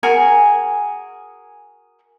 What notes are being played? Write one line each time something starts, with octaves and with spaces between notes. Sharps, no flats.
F#4 G#4 A#4 G#5